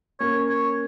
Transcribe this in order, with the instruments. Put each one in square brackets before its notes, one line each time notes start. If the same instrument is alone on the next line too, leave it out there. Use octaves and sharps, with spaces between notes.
[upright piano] A#3 C#4 [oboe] C#5
[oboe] C#5